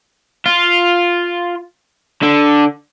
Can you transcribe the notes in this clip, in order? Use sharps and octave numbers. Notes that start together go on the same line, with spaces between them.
F4
D3